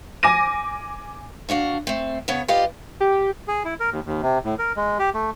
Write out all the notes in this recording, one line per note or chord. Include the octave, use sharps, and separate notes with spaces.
G#5 D6 A#6 D#7
D2 D4 F#4 F5
A3 C4
C#3 B3 C#5
F4 G4 B4 D5 D#5 F5
G4
G#4
E4
A#4
D#2
D#2
C3
A2
A#4
G#3
G4
A3